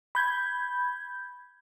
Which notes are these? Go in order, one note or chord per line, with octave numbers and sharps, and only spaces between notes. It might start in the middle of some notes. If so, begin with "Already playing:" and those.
B5 G6 G#6